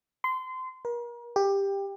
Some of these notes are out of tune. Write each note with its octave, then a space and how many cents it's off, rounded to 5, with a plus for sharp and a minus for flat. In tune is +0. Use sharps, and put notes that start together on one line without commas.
C6 -25
A#4 +40
G4 +15